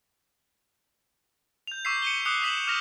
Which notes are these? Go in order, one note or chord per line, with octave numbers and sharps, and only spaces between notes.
G6 F7
C#6 D6 E6 G6 B6 C7
C#7 D#7 G7
D6 D#6 F#6 C#7 F7 G7
D#6 F#6 B6 C7 E7 F#7
D6 F6 G6 A#6 F7